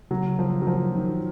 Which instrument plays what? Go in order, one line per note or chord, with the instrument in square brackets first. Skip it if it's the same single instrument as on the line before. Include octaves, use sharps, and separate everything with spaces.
[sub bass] C#3 [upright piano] F#3
[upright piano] F3
F#3
F3
D#3